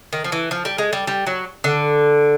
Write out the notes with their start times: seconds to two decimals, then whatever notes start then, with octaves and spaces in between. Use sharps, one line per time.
0.13 D#3
0.24 F3
0.32 E3
0.51 F3
0.65 G3
0.78 G#3
0.93 G3
1.07 G3
1.27 F#3
1.64 D3